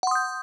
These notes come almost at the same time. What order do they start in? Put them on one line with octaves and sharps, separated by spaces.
F#5 C6 D#6 G6